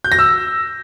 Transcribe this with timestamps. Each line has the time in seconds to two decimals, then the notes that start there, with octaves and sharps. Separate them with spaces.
0.04 G6
0.12 A#6
0.19 E6